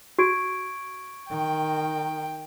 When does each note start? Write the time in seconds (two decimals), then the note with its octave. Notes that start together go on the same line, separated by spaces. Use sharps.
0.18 F#4 C#6 G#6 D7
1.30 D#3 G5